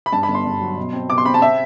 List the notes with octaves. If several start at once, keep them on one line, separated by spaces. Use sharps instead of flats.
B5
G2 A5
B5
G1
C6
G2
F#3
B2
C4
B2 D6
C6
C4 B5
A5
C4 E5